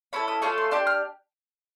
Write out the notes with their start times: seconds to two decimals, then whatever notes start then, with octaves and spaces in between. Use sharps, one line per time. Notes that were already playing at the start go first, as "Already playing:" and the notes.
0.13 C#4 E4 A4 B5
0.28 D#6
0.42 A3 C#4 F4 A4 C#6
0.58 C6
0.71 D4 G4 C6
0.87 F6